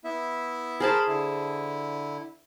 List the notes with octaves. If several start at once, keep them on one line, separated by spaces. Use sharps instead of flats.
B3 E4 E5
G#4 A#4 C5 A5 B5
D3 E4